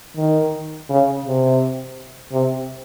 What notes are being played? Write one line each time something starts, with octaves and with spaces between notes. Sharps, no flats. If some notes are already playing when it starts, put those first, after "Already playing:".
D#3
C#3
C3
C3